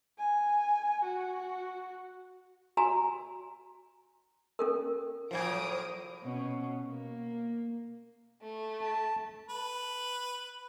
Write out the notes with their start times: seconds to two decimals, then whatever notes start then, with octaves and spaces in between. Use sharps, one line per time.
0.19 G#5
1.04 F#4
2.77 F#4 G#5 A#5
4.59 C#4 A4 A#4
5.31 A2 F3 F#3 A#3 C5 G#5 D#6 D7
6.23 B2 C#4
6.88 A#3
8.42 A3
8.81 A5
9.49 B4